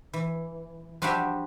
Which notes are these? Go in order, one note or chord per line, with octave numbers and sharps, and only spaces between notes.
E3
F3 G3 D4 F#4 G4 E5